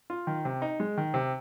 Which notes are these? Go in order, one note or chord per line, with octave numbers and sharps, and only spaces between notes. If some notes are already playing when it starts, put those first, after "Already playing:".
F4
D#3
C3
D#4
G#3
D#3
C3